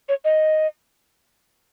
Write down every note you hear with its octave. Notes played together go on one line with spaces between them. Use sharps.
C#5
D#5